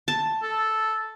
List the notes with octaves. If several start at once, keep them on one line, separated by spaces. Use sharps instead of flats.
A5
A4